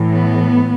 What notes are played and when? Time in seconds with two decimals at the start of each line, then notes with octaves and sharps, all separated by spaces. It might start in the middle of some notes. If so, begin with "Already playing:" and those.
Already playing: A2 E3
0.10 B3